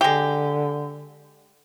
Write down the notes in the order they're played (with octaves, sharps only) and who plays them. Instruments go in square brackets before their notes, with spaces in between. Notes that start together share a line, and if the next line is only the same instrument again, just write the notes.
[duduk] D3 [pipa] G#3 G4